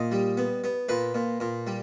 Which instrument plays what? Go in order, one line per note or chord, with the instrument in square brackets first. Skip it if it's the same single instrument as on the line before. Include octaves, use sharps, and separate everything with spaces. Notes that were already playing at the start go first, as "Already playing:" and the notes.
Already playing: [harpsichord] A#2 D#5
G3
B3
B3
A#2 B4
A#2
A#2
G3